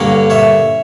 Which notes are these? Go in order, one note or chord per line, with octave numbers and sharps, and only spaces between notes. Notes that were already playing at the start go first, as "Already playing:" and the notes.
Already playing: G2 D3 A#3 A#4 C#5
C#5 E5